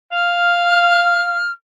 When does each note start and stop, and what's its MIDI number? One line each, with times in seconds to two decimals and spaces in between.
0.12 1.38 77
0.12 1.51 89